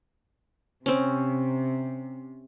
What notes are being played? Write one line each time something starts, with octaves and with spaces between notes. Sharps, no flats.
C3 C4 C#4